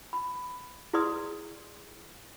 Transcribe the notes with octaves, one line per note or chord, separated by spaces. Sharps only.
B5
E4 G#4 B4 D5 C6 D#6